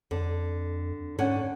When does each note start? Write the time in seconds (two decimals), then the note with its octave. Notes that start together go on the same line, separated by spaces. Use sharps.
0.11 F2 D3
1.18 G#2 D3 C#4 F#5